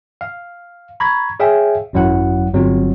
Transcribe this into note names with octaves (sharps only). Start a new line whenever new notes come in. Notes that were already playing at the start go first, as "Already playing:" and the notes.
F5
A#5 B5 C#6 G#6
G#4 C#5 E5 F5 G5 G#5
G#1 F#2 F#3 E4 F#5
G1 F#3 C4 F4